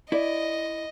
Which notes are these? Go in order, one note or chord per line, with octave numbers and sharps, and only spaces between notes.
E4 D5 D#5